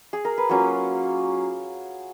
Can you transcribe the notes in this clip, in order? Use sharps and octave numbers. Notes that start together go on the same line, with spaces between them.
G#4
A#4
B4
F#3 A#3 C#4 F4 C#5